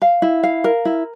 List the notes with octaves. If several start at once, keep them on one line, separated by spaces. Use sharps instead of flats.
F5
E4
F5
A#4
E4